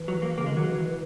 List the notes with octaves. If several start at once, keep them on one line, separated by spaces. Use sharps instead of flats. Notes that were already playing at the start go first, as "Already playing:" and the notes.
Already playing: E3
F#3
A#3
C#3 A#3
G#3
D#3 F#3
E3
E3